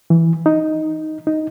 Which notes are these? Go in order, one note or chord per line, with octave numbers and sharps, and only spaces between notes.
E3
D#4
D#4